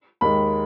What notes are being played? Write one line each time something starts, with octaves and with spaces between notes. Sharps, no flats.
D#2 D#3 G#3 B5